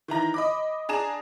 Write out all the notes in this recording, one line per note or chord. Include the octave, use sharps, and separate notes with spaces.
D#3 E3 A#5 A#6
D#5 B5 D6
D4 G#4 A#5 E7